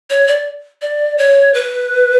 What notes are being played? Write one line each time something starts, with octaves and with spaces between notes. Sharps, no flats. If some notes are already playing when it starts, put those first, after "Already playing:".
C#5
D5
D5
C#5
B4